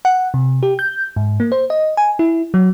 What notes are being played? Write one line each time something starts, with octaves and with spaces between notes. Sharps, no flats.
F#5
C3
G4
G6
G#2
A#3
C5
D#5
G#5
E4
F#3